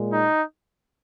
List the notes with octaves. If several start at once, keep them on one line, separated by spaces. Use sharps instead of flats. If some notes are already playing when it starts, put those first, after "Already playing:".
Already playing: A#2 G#3
D#4